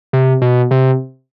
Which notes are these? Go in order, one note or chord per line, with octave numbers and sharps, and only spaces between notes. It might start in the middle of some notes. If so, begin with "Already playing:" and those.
C3
B2
C3